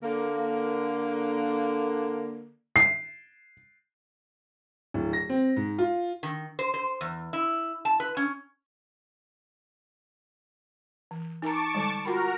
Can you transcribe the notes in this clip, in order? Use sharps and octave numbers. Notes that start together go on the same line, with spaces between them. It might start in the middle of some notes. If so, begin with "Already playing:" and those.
D3 A#3
C7
D1
A#6
C4
G#2
F4
D#3
C5
C5
E2
E4
A5
B4
C#4
E3
D#4 A#4 A5 A#5 C#6 D6
D3 G3 G#3
F4 F#4 A#4 G5 A#5 B5